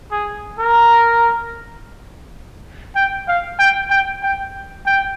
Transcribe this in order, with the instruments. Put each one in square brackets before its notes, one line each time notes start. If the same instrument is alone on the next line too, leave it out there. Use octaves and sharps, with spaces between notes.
[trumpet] G#4
A#4
G5
F5
G5
G5
G5
G5